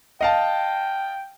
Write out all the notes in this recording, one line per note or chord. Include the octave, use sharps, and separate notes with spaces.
D#5 F5 G5 A5